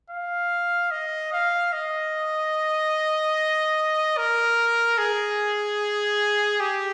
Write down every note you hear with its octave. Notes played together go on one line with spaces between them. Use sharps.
F5
D#5
F5
D#5
A#4
G#4
G4